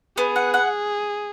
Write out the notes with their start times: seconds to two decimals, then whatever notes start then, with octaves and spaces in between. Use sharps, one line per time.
0.18 B3 G#4
0.36 F#5
0.54 F#5